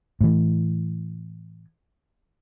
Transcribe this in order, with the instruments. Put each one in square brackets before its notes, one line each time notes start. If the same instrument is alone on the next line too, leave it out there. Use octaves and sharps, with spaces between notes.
[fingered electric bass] A2 E3